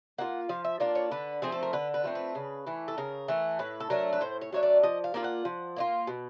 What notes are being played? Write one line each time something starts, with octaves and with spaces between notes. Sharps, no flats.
A#3 D4 F4 F#5
F3 F5
E5
A#3 D4 F4 D5
C#5
D3 B4
F3 A3 C4 G#4
A4
A#4
D3 B4
B4
F3 A3 C4
B4
C#3
E3 A3
A4
C#3 A#4
E3 A3
A2 B4
A4
F#3 A3 D4 A#4
B4
A2 C5
C#5
F#3 A3 D4 C#5
D5
F3 D#5
F5
A#3 D4 F4
F#5
F3
A#3 D4 F4
B2